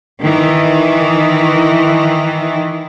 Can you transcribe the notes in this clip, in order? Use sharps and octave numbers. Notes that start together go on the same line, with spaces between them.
D#3 E3